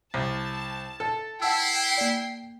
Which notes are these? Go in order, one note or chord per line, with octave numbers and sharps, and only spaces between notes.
C2 A5
A4
E4 F#5 G5 A5 E6 C7
A#3 D5